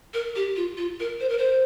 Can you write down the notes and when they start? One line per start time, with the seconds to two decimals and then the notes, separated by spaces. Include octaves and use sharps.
0.13 A#4
0.35 G4
0.56 F4
0.77 F4
0.99 A#4
1.20 C5
1.29 A#4
1.38 C5